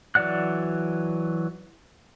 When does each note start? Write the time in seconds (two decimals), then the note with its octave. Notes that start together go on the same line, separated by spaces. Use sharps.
0.15 E3 F#3 D5 F#5 F#6